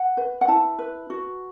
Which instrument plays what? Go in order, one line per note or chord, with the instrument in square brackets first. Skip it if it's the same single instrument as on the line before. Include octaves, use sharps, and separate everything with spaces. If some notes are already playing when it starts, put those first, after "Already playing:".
Already playing: [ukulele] F#5
B4
F#5
E4 A5
B4
F#4